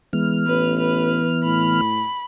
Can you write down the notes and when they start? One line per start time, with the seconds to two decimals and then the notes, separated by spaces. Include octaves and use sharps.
0.13 E3 G#3 B3 F6
0.47 A1 B4
0.79 B4
1.44 A2 B5